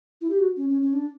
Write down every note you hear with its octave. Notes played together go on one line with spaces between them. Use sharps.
E4
G4
F#4
C#4
C#4
C#4
D4